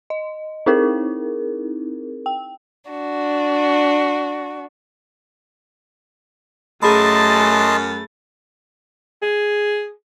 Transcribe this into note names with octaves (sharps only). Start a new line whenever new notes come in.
D#5
C4 D#4 E4 G#4 A#4
G5
D4 F#4
F#2 A3 G#4 D#5 A5 B5 C6 A6
G#4